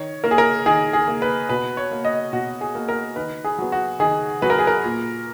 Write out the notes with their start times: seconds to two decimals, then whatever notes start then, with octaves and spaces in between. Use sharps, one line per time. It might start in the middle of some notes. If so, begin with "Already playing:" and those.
Already playing: D#3 C#5
0.24 A#3 A#4
0.31 G#4
0.38 A#4
0.66 D#3 G#4
0.93 G#4
1.08 A#3
1.22 B4
1.49 B2 B4
1.77 C#5
1.92 A#3
2.05 D#5
2.33 B2 F#4
2.61 G#4
2.75 A#3
2.89 A#4
3.16 D#3 B4
3.44 G#4
3.58 F#3 B3
3.72 F#4
4.00 D#3 G#4
4.42 F#3 B3 B4
4.50 A#4
4.59 G#4
4.67 A#4
4.84 A#2